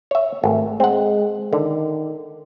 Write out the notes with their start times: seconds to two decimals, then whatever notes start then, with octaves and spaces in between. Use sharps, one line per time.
0.11 C#5 E5
0.44 G#1 A3
0.80 G#3 C4 F#5
1.53 D3 D#3